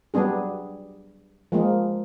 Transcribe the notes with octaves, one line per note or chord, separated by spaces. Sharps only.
F#3 G3 B3 D4 G#4
F3 G#3 A#3